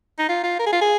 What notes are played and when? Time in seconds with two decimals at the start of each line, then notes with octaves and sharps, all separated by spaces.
0.19 D#4
0.29 F4
0.43 F4
0.59 A#4
0.66 G#4
0.73 F4
0.81 G#4